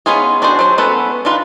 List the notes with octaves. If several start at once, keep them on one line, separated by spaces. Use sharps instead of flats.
B3 C#4 D#4 F4 G#4
D4 D#4 F#4 G#4 C5
F#3 C5
B3 C#4 A4 B4
D4 D#4 F4 B4